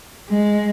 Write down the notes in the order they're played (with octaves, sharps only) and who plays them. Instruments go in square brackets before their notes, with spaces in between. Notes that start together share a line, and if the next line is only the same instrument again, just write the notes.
[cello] G#3